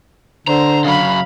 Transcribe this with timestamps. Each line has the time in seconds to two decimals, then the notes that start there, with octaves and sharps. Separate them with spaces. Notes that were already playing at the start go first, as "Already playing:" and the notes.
0.48 D3 C5 A#5
0.85 C#3 F#3 F5 B5